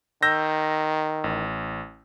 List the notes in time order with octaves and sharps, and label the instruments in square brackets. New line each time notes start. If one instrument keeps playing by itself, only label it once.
[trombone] D#3 [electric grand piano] E6 G6 A#6
[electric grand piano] A1